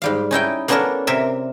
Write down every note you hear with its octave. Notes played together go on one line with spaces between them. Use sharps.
G#2 G3 F5
C#4 D#4 E4 G5
A#3 B3 C#4 D4 A4 A#4
C3 A#4 E5